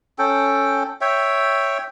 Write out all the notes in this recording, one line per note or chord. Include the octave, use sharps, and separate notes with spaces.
C#4 A4 G5
C#5 E5 G5